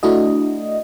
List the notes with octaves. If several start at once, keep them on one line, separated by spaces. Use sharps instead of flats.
A3 D4 E4 F#4 D#5